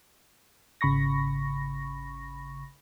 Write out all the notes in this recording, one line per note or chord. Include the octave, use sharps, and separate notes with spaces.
G#1 C#3 B5 C#6 A#6